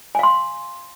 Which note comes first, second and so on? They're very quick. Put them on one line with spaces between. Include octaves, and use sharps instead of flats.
G#5 F5 C6